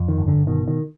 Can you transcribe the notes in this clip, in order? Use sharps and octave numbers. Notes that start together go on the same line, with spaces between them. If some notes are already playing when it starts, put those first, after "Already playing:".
Already playing: F2
D#3
G1
D3
B2 D#3
D#3